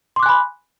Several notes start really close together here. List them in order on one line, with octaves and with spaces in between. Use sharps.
C6 D6 F#6 G#5 B5